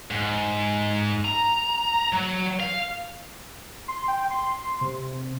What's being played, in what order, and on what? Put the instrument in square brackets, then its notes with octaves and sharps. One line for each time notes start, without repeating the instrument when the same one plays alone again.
[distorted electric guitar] G#2
A#5
F#3
F5
[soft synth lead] C6
G5
C6
C3